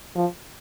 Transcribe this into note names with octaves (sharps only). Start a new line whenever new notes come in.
F3